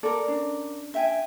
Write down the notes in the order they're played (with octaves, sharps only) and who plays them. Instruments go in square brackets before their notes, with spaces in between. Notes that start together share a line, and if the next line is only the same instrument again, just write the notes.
[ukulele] A4 [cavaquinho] A#4 D5
[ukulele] C#4 D4
[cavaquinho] E5 G5 G#5